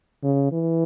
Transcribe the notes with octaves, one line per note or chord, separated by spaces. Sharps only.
C#3
E3